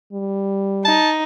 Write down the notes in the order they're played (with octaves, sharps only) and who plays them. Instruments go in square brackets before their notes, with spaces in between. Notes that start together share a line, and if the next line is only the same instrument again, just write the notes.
[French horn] G3
[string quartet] D#4 [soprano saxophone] A5